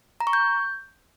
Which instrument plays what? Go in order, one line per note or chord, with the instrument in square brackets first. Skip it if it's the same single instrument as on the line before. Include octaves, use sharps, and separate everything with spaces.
[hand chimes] A#5
C#6
G6